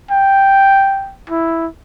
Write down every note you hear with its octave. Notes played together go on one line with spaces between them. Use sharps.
G5
E4